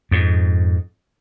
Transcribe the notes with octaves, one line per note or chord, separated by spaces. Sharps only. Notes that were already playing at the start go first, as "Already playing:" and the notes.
F2 G#2